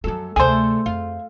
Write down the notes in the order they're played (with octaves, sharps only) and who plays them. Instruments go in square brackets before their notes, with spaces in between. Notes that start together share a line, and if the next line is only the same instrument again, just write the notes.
[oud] F#2 A4 [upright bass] F3 F#3
[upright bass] D2 C3 [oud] A3 D4 A4 [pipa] G#4 C5
[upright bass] F2 [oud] F4